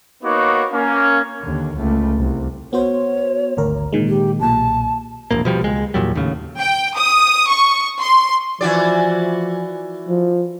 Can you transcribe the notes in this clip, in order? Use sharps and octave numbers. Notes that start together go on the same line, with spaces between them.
A#3 B3 D#4 F#4 C#5 D6
A#3 C#4
D#2 D3
C#2 A3
C2
B3 F#4 C5 C#5
G#1 D2 A#4
A#2 D#3 G#3
G4
B1 A#2 A5
E1 A#1 A#3
B2 F3 G3
C#2 G#3
E2 A#2 F#3 G3
D#2 A2 C#3
G5
D#6
C#6
C6
E3 F3 F#4 D5
F3